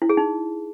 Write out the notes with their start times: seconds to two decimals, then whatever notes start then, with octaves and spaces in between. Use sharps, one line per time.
0.02 E4
0.09 G#4
0.17 D#4